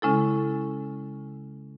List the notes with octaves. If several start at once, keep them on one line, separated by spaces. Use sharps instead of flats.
C#3 G#3 C#4 E4 A4